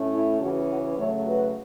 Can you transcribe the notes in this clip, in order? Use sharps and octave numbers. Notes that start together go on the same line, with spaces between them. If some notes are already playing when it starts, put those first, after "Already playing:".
Already playing: A2 A3 C#4
E4
C#3 E3 C#4 F#4
F#4 B4
C#3 F#3 A3 A4 C#5
F#4 B4